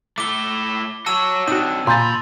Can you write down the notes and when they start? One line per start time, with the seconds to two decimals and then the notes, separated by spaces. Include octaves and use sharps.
0.18 A3 E4 D6 G7
1.06 F#4 C#5 A5 E6 D#7
1.48 C4 D4 D#4 F#4 D#7
1.87 A#2 G#5 B5 C6 G6 A6